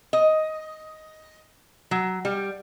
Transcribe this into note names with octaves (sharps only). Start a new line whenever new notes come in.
D#5
F#3
G3